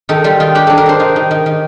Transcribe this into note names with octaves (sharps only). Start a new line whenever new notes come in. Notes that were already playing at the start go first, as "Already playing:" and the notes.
D#3 A4
G3 F4
D#3 F4
D4 G4
D4 A4
A#4
D4 C5
D#3
D#3
D#3
D#3